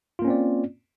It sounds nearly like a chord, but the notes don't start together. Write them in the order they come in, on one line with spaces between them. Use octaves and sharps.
F4 A#3 C#4 C4 D5